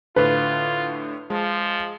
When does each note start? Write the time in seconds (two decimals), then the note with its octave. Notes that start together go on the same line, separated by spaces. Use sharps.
0.16 A2 D3 F4 B4
1.30 F3 G#3